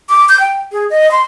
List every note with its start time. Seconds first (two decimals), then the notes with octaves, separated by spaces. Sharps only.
0.09 D6
0.29 G6
0.40 G5
0.72 G#4
0.90 D#5
1.11 C6